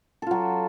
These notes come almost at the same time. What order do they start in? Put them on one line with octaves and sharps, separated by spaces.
A4 F4 F#3